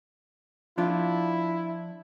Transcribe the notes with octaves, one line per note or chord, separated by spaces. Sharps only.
F3 D4 E4 F4